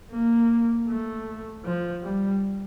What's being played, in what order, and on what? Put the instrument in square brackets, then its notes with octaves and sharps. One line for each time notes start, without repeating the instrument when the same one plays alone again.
[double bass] A#3
A3
F3
G3